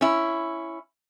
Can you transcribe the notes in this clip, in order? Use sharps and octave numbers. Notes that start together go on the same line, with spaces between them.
C#4 E4